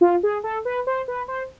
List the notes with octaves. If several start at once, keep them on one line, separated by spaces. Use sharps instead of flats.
F4
G#4
A4
B4
C5
B4
C5